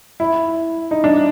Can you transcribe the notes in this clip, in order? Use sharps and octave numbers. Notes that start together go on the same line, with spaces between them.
E4
D#4
D4